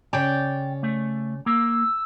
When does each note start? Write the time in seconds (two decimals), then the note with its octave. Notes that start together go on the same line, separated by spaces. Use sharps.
0.13 C#3 C#5 D5 G5
0.83 A3
1.46 A#3 E6